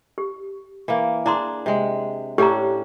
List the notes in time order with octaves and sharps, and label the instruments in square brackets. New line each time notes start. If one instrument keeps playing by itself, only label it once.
[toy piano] G4
[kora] E3 A#3
[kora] D4 G#4 [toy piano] E4 A#5 C6
[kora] C3 G#3
[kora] A2 C#4 D4 [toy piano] G4 A#5